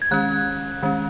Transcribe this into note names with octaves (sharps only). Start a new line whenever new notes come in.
G#6
D#3 G#3 C#4 F#6
D#3 G#3 C#4